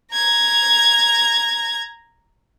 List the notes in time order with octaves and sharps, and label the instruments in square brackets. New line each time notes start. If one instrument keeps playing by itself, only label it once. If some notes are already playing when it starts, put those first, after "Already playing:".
[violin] A#5 G#6